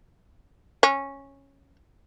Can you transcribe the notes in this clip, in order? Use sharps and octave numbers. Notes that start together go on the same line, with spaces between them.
C#4